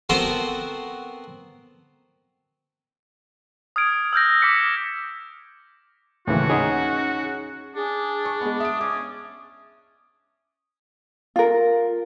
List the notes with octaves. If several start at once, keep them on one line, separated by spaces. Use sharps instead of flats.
B3 C4 F#4 A4 A#4 C5
D#6 F6 G#6 D7
E6 F6 G6 A#6
D6 D#6 B6 C#7
D#2 A2 C#3 E3 F3 F#4
C#4 D#4 G#4 F#5
D4 G#4
C#6
G#3 B3
E5 D#6 D7
C#4 D6
F4 A#4